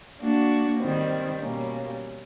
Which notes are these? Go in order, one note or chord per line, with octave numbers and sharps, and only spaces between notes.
A#3 D4 F#4
D#3 G3 C4
B2 G3 A#3 C#4